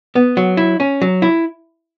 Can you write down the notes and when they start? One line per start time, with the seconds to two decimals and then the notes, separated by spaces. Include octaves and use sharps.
0.15 B3
0.37 F#3
0.57 E4
0.80 C#4
1.02 F#3
1.22 E4